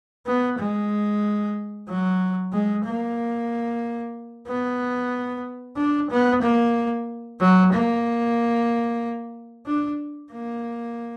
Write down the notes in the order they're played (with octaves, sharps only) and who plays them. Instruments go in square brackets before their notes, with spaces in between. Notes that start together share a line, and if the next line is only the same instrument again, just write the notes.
[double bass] B3
G#3
F#3
G#3
A#3
B3
D4
B3
A#3
F#3
A#3
D4
A#3